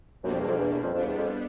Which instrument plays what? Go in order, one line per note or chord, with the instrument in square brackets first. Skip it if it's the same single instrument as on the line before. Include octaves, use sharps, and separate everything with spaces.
[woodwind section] F#2 [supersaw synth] B2 G3 A#3 D4
[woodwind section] F2
E2
F2
E2
E2
F2
[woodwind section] F2 [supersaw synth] G3 B3 D4
[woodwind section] E2
F2